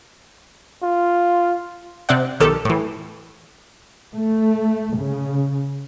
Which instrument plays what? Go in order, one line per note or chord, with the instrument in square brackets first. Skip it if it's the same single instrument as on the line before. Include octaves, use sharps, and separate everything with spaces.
[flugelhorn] F4
[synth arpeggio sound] C3 C4 D5 F#5
B1 D#3 G4 A4
A2 E3
[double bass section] A3
C#3